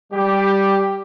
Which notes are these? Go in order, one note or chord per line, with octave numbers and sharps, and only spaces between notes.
G3 G4